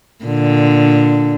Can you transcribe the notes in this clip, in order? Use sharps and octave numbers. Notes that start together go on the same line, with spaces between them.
A#2 D3